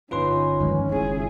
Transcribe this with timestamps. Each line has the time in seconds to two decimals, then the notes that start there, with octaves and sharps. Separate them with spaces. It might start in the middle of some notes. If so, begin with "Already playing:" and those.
0.11 G1 C#4 D#4 F4 B4 C6
0.61 G2 D#3 F3 G#3
0.89 F#1 E4 F4 G#4